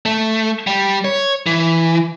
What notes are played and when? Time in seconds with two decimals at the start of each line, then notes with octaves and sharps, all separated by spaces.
0.06 A3
0.67 G3
1.05 C#5
1.46 E3